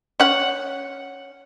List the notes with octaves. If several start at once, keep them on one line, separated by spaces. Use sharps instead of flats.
C#4 F#5